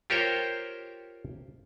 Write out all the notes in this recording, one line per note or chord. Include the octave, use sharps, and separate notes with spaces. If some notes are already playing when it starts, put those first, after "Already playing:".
F4 G4 A#4 C5 C#5 G5